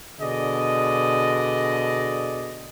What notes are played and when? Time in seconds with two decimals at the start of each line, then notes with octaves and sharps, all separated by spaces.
0.20 B2 D3 G#4 D5 D#5